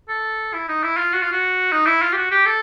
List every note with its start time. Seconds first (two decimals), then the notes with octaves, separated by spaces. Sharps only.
0.09 A4
0.54 E4
0.69 D#4
0.83 E4
0.97 F4
1.13 F#4
1.22 F4
1.32 F#4
1.72 D#4
1.86 E4
2.02 F4
2.13 G4
2.16 F#4
2.31 G4
2.46 A4